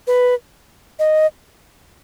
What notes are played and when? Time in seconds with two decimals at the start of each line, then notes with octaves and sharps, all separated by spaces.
0.07 B4
0.99 D#5